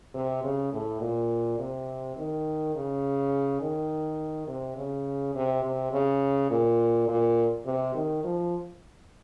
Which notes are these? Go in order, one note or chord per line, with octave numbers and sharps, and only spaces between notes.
C3
C#3
A2
A#2
C3
D#3
C#3
D#3
C3
C#3
C3
C3
C#3
A#2
A#2
C3
D#3
F3